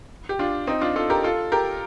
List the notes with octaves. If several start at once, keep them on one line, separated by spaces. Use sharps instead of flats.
G4
D4 F4
C4 D#4
D4 F4
F4 A4
G4 A#4
F4 A4
G4 A#4